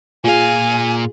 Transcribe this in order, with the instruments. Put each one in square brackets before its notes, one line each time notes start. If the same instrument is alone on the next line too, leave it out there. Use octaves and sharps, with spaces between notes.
[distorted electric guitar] A#2 F5 [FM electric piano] F4 G#4 [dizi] G#5